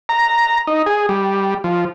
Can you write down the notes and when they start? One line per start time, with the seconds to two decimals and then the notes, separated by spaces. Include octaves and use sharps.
0.09 A#5
0.67 D#4
0.86 G#4
1.09 G3
1.64 F3